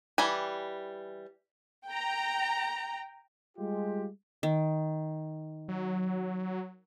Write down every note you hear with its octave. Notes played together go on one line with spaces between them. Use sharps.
E3 G3 G#5
G5 A#5
G3 G#3 F4 G4
D#3
F#3